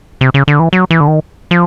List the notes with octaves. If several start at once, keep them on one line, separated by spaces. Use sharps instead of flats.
C3
C#3
D3
E3
F#3
E3
D3
D#3
F3